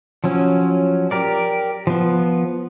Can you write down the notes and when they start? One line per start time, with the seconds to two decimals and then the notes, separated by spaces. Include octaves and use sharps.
0.24 F3 F#3 C#4
1.11 G4 A#4 D5
1.87 F3 B3